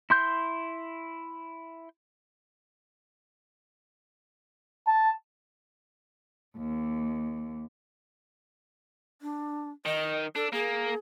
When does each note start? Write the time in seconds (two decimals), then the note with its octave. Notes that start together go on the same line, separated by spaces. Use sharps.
0.10 E4 C6 G6
4.87 A5
6.56 D#2
9.22 D4
9.86 D#3 D#5
10.36 D4 A4
10.53 A#3 G#4